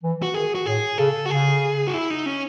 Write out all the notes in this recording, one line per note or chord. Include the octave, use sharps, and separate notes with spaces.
E3
F#4
D#3 G#4
F#4
A2 G#4
C#3 A4
F#4
C#3 G#4
F#4
E4
D#4
C#4